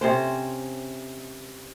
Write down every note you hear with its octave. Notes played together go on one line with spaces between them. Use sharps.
C3 C#4 C5